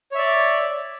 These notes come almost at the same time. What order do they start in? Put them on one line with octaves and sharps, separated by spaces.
C#5 E5 D5